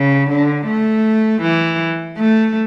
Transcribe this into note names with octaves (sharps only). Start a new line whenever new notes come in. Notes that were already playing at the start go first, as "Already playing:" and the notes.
Already playing: C#3
D3
A3
E3
A3